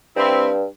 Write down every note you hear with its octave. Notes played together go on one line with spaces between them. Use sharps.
G2 C4 E4